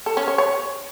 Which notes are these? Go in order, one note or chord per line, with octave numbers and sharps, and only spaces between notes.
A4
C#4
C#5
C#5